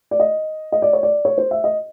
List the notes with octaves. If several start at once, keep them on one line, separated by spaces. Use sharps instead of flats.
D5
D#5
D#5
D5
C#5
D5
C#5
C5
E5
D#5